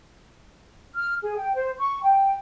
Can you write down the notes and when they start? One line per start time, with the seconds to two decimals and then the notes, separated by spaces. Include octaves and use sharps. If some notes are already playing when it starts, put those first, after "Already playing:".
0.95 F6
1.22 G#4
1.37 G5
1.55 C5
1.78 C#6
2.03 G5